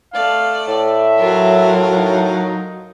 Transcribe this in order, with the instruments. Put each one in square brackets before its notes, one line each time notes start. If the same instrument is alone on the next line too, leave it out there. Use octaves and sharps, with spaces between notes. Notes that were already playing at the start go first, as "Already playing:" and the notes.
[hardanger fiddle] A3 D5 [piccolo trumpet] F5
[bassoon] A2 [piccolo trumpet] E5
[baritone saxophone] F#3 [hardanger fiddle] F4 A#4
[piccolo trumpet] D#4